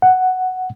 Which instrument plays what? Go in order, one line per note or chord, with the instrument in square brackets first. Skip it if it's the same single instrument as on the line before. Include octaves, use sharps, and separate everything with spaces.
[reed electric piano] F#5